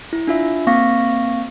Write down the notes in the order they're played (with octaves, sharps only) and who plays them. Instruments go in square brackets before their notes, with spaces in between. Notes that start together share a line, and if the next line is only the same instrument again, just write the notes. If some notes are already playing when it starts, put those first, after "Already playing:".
[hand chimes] E4
D4 F4 E5
A#3 C4 F5 C#6 A#6